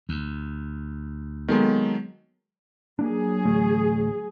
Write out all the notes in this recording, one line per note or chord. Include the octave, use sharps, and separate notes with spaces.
D2
D#3 F#3 G#3 A#3 B3 A4
F#3 A#3 D4 G#4
A1 D2 A3